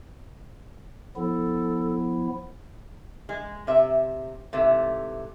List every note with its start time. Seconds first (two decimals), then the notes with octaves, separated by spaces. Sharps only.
1.16 F3 B3 E4 A4
3.29 G#3
3.67 C3 E5
4.53 G#2 C3 E3 A3